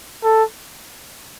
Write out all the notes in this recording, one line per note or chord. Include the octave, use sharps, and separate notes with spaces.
A4